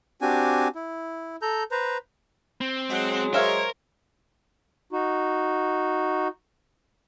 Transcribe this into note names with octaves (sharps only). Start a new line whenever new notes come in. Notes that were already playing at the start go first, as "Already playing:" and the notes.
C4 D4 F#4 G4 G#5
E4
A4 A#5 G6
B4 C5 A#5
C4
F#3 G#3 F#5
A#4 C5 C#5 E5 F5
D#4 F#4